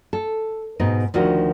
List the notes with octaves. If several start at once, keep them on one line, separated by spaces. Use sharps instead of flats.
A4
G#2 B2 B3 D#4
D2 D#3 F3 F#4